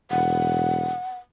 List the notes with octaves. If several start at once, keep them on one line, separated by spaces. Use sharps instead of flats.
E1 F#5